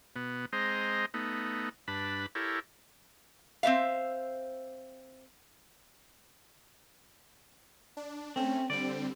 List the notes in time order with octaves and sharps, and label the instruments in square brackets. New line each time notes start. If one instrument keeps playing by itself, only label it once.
[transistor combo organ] B2 B3
G#3 C4 C5 D#5 A#5
A3 B3 D#4
G2 D4 B4 A5 B5
E4 G4 A4 A#4 C#5
[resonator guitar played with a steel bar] C4 C5 E5 F5
[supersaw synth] D4
[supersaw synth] A3 C#4 [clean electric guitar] C4
[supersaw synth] D3 G3 C4 [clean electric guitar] D5